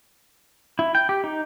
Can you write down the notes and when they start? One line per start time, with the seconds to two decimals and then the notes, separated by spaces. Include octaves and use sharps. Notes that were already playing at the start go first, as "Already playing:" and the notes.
0.79 E4
0.95 G5
1.09 G4
1.24 D#4